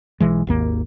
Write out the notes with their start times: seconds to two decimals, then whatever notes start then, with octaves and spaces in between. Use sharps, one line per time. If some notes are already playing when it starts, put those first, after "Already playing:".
0.20 B1 E3 G#3
0.47 G#1 D#2 A#3